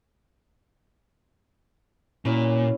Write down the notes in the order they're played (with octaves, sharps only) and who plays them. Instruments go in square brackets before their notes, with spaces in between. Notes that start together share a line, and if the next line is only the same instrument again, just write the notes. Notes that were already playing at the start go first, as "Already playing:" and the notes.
[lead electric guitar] A#2 [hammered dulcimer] C#4 E4 F#4